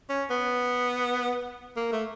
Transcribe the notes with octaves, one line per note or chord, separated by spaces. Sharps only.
C#4
B3
A#3
A3